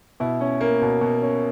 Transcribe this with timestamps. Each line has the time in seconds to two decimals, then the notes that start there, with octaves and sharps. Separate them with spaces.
0.20 B2 E4
0.40 C#4
0.61 A#3
0.81 B2
1.01 B2
1.22 C#4